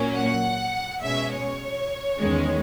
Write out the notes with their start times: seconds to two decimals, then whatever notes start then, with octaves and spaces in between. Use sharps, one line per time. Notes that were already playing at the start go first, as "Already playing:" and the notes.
Already playing: A#2 F#3 A#3 C#4
0.15 F#5
1.02 B2 G#3 C#4 E5
1.32 C#5
2.19 E2 D#3 G#3 C#4